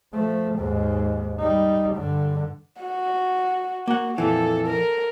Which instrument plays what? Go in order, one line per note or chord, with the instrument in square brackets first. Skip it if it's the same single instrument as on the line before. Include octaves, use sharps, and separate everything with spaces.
[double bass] F3 A3
D#2 G#2
G3 D#4
G2 D3
[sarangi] F#4
[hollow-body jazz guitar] A#3 F#5 [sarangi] F#4
[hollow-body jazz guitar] F2 A#2 E3 [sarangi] A4
[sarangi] A#4